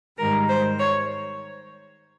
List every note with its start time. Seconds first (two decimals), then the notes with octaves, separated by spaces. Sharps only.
0.18 G#2 D#3 G3 A#4
0.49 C5
0.79 C#5